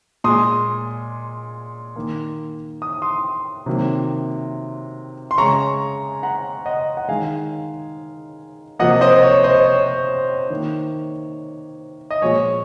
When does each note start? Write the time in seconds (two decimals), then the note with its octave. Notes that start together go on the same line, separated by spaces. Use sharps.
0.24 A#2 G#3 C6 D#6
1.96 D#3 A#3
2.82 D#6
3.02 C6 D#6
3.66 C3 D#3 F#3 A#3
5.31 C6
5.38 C#3 G#3 A#5 C#6
6.23 F#5 A#5
6.66 D#5 F#5
6.97 F#5
7.08 D#3 G#3 F5 G#5
8.79 C3 F3 A#3 D#5 F#5
9.01 C5 D#5
9.23 C#5
9.44 C5 D#5
9.65 C#5
10.50 D#3 A#3
12.11 D#5
12.22 A#2 F3 G#3 C#5